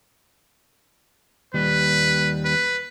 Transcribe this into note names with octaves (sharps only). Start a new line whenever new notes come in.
D#2 G3 B4
B4